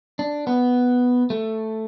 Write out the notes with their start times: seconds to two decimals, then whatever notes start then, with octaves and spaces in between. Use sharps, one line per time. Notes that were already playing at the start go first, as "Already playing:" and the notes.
0.19 D4
0.47 B3
1.30 A3